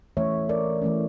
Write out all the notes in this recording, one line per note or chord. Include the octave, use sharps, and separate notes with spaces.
E3 A3 C#4 C#5 E5
A#4 D5
E3 A3 C#4